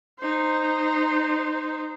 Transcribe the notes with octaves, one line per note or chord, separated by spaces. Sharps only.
D#4 C5